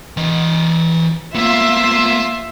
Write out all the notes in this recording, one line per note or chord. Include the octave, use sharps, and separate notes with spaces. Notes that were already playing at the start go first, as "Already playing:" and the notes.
E3 D#5
A#3 B3 F4 E5 C6